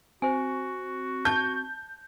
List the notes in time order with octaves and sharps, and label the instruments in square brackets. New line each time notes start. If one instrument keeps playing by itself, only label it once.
[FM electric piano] C4 C#6 [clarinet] F#4 [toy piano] C5 G#5
[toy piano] A5 [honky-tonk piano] G6